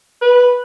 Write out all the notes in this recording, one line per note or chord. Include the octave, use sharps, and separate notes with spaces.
B4